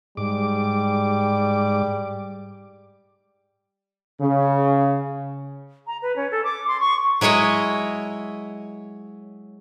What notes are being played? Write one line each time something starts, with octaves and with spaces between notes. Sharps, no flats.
G#2 G3 D6
C#3
A#5
B4
C#4
A4
D6
C6
C#6
F#3 G#3 E4 C#5 D#5